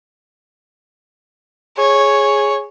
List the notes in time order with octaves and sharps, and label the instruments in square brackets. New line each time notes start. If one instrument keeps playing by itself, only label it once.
[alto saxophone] G#4 [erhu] C#5